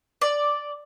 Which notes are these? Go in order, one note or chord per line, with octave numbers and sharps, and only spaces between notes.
D5